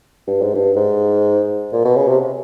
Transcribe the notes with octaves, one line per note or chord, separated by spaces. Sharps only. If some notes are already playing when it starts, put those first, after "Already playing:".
G2
G#2
G2
G#2
A#2
B2
C#3
C3